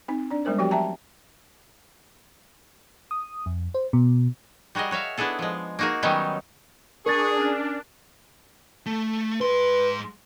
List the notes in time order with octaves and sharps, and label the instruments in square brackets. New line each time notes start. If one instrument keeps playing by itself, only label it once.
[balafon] C4 D#4
D4 D5
G3 G#3 B3 A#4 C5
F3 F#3 B3 F#4 G4 G5
E5 G5 A5 A#5
[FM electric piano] D#6
F2
C5
B2
[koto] G3 F#4 G#4 A#4 D#5
F#4 C#5 E5 F5
B3 D4 E4 G#4 A4
F3 G#3
A#3 D#4 F#4 G#4 A#4
D#3 F#3 G3 B3 C#4 D#4
[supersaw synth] D4 [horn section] G#4 [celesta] A#4 A6 [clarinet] C#6
[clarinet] C#4
[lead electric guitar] A3
[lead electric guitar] G#2 C6 [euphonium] B4